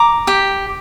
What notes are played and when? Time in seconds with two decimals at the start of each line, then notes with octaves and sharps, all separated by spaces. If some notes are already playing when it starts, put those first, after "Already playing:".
Already playing: A#5 D6
0.27 G4